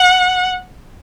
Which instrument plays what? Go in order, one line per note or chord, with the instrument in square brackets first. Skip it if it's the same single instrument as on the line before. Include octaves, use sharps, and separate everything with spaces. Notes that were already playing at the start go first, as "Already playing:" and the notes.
Already playing: [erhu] F#5